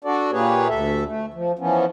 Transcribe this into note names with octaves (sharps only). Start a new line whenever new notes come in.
D4 F#4 A4 D5
A#2 A#3 G4 G#4 B4 C#5
D2 A4 E5
A3
F3
E3 F3 B3 C#4